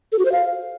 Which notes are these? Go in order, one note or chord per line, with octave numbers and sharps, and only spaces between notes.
A4
F#4
C5
F5